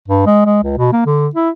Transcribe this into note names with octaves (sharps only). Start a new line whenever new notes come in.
G2
G#3
G#3
C#2
B2
A#3
D3
E4